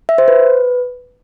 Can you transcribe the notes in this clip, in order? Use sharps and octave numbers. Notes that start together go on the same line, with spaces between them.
E5
C5
B4